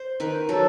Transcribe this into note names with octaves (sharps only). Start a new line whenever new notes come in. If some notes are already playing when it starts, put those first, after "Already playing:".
Already playing: C5
D#3 B4
F#3 A4